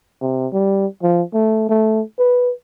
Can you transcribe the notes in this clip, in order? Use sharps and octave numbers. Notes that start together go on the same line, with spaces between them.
C3
G3
F3
A3
A3
B4